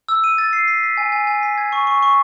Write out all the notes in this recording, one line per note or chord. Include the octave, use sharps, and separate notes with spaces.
E6
D#7
A6
C7
B6
B6
G#5
G#5
G#5
B6
G#6
C#6
C#6
C#6